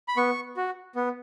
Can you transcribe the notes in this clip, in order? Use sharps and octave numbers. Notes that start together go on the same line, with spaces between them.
B5
B3 C#6
F#4
B3